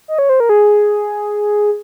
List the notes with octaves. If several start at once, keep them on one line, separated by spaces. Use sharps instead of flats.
D#5
C#5
C5
A#4
G#4